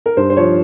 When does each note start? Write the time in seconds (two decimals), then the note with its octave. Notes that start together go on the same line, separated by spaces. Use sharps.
0.06 A#4
0.17 G2 C5
0.30 C5
0.37 F3 C#5